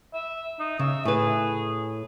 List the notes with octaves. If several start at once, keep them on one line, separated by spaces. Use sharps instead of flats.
E5
D#4
C#3 E5
A2 G#4 B4